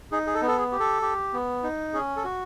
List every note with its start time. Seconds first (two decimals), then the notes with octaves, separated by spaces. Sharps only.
0.12 D#4 G#4
0.27 G#4
0.34 A4
0.41 B3
0.48 A4
0.57 G#4
0.72 G4
0.80 A4
1.02 G4
1.33 B3
1.63 D#4
1.93 C#4 G#4
2.16 A4
2.24 F#4